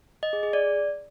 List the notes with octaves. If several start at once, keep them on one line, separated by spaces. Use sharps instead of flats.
D#5
G#4
G#4
D5